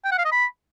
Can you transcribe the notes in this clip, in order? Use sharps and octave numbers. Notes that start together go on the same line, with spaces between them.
G5
F#5
F5
D#5
B5